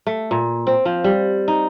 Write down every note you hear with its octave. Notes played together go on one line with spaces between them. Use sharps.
A3
A#2
C4
F3
G3
D#4